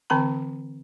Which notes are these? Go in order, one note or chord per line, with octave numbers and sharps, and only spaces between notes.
D3 E3 C4 A#5 B5